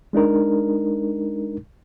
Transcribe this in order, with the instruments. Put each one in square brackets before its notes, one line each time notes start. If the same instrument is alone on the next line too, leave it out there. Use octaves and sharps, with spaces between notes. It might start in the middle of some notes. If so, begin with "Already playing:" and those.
[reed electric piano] G#3 D4 D#4 A#4